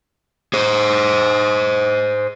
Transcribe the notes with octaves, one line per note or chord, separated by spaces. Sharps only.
G#4 C5